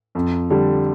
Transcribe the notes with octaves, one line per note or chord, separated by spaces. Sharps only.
F2
D3 G3